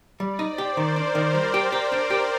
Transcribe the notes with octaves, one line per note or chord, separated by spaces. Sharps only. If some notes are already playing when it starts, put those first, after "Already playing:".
G3 D5
D#4
C5
G4
D#3 A#4
D4
C5
D#3
G3
G4
G4
D4
G4